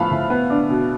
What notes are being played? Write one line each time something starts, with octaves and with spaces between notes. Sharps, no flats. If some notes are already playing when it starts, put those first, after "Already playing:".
Already playing: A2 F3 B3 F5 A5 B5
A2
B3
D4
B2